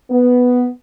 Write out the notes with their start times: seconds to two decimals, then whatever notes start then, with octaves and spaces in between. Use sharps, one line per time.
0.09 B3